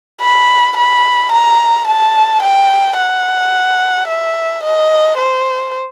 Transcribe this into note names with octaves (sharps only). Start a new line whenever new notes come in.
B5
B5
A#5
A5
G5
F#5
E5
D#5
C5